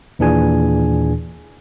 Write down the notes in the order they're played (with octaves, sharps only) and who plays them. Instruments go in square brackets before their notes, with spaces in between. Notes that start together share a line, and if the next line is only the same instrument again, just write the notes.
[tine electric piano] D#2 A#2 E3 D4 G#4 G#5